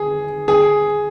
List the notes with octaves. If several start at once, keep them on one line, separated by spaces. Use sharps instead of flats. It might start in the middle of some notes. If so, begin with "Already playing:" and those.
Already playing: G#4
G#4